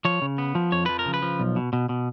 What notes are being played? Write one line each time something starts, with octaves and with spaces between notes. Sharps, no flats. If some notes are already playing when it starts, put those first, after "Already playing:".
F3 C#5
C#3
B3
F3
F2 C#5
F3 B4
A#4
C#3
B4
F3
B1
B2
B2
B2